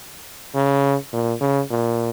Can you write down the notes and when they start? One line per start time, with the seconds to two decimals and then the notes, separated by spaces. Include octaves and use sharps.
0.55 C#3
1.13 A#2
1.41 C#3
1.71 A#2